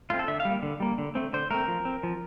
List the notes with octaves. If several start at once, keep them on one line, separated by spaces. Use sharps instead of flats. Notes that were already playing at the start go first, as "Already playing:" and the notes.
A3 C4 F4
A4
D3 E5
F5
G3 A#3
D3
G3 A#3
D3
A3 C4
D3 C5
A3 C4 A#4
F3
C4
F3